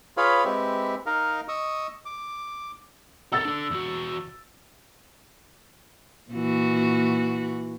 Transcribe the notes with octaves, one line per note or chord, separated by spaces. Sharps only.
F4 G#4 B4 C#5 F5 B5
G#3 C4 G4 B4 E5
D#4 A#4 D#5 F5
D#5 C#6 D#6 E6
D6
A4 A#4 E6 A6
D4 A4
E2 F#4
A#2 E3 F#4